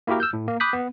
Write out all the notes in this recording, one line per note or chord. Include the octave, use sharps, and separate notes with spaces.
A#3 E4 F#4 G4 A#4
E6 F6 G6
A2
A#3
B5 D6 D#6 F#6 G6 B6
B3